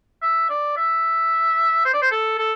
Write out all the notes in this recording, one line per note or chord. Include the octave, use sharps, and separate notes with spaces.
E5
D5
E5
C5
D5
C5
A4
A4